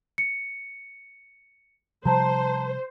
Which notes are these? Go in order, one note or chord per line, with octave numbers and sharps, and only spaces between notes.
C#7
C3 F3 G3 C5 A5 A#5